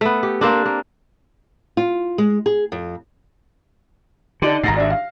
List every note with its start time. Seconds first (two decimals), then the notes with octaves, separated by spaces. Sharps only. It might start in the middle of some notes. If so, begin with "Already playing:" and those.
0.01 A3 B3
0.23 G4
0.41 A#3 C4 D4
0.65 A#3
1.77 F4
2.18 G#3
2.46 G#4
2.72 F2
4.42 D3 D4 D#4 G4
4.64 G#1 G#2 A#5 A#6 C7
4.77 D4 E5
4.90 F5